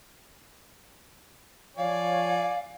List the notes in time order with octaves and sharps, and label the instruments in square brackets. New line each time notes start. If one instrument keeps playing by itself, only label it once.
[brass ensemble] F3 C#5 [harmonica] D5 G#5 [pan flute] F5